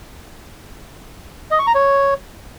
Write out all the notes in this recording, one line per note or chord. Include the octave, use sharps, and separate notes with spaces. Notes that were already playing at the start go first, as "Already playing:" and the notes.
D#5
C#6
A#5
C#5